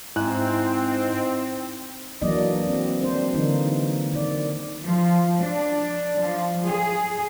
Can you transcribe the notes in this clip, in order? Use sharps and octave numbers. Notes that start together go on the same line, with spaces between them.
G#2 C4 D#4 E4 F#6
E3 F#3 A#3 D4 D5 D#5
C4
F#3 C4 D4 C5
D3 E3 A#3 D#4
D#3 D5
F3
D4
F3
G#4